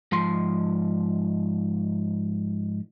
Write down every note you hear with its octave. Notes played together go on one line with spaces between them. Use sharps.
G#2 F3 C6